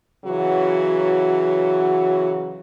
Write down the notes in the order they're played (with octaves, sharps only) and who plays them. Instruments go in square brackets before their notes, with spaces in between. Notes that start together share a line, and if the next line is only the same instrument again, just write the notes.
[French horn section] C#3 E3 F#3 F#4